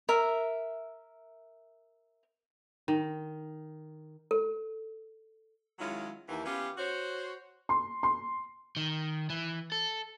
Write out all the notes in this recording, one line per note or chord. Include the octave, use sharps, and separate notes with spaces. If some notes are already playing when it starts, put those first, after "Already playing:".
A#4 E5
D#3
A4
D#3 F#3 G#3 C#4 E4 F4
D#2 E3
E3 B3 C#4 F4 G4
F#4 C5 C#5
C6
C6
D#3
E3
A4